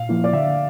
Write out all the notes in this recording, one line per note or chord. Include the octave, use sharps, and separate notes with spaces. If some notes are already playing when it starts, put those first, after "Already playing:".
Already playing: A#2 F5
F3 A#3 E4
D5
D3 E5